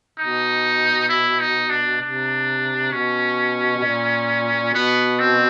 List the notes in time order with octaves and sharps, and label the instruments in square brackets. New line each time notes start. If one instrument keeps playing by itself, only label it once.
[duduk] B2 [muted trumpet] D#4
[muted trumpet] E4
D#4
D4
[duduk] C3 [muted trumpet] D4
[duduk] B2 [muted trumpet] C#4
[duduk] B2
A#2
[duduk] B2 [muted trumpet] B3
[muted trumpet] C4